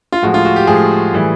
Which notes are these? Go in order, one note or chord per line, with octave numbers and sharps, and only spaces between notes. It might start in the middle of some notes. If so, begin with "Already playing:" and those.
F4
A2 F3 G#3 F#4
F4
F#4
G4
A2 F3 G#3 G#4
A2 E3 G3